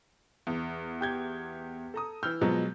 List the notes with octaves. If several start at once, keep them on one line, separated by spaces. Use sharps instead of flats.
E2
G4 G6 G#6
A4 A#5 D#6
E3 E6 F6 G6
B2 F3 F#3 G#3 B3